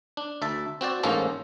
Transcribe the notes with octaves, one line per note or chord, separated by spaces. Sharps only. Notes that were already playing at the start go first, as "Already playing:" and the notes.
D4
D2 E5 A5
C4 F#4 C5 D5
A1 G#2 A#3 C#4 A4 C5